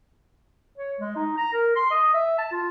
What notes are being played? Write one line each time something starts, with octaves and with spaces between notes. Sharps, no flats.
C#5
G#3
D#4
A#5
A#4
C6
D#5
E5
A5
F4